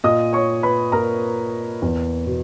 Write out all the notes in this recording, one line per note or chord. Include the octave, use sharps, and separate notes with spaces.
A#2 D#5 D#6
C#5 C#6
B4 B5
A#2 A#4 A#5
E2
B2